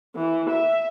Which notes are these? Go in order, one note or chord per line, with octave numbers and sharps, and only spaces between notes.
E3
E5